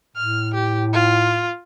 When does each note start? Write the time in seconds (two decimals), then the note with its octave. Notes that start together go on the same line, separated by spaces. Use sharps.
0.16 A2 F6
0.54 G4
0.93 F4